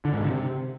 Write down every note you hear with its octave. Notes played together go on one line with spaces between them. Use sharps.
D3
G#2
D3
C3